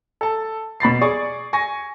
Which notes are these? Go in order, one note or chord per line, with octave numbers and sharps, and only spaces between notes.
A4 A5
B2 B5 A6 C7
G#4 D5 C#6
G#5 C#6 A#6